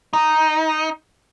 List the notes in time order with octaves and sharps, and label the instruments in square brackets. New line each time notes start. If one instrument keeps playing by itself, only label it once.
[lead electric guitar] D#4